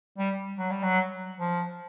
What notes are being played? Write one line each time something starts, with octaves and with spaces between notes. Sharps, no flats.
G3
F#3
G3
F#3
F3